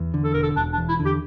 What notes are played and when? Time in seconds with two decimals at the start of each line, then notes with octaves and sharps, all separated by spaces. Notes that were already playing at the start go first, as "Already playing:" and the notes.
Already playing: E2
0.14 D3
0.24 A4
0.34 E1 A#4
0.43 A4
0.56 E1 D4
0.73 D4
0.78 E2
0.89 E4
1.00 D3
1.05 G4